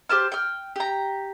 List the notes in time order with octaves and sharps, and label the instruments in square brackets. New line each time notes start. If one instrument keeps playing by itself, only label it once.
[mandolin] G4 C5 A5 F6
G5 F6
G4 A#5